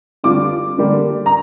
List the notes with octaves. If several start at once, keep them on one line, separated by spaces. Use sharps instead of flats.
D3 G3 D4 F4 D6
D3 G3 A#3 D4
A#5